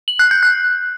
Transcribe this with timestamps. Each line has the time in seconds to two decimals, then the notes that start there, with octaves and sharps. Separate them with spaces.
0.08 F#7
0.19 F#6
0.31 G6
0.43 F#6